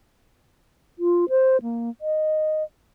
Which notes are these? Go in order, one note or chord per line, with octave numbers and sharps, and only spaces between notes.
F4
C5
A#3
D#5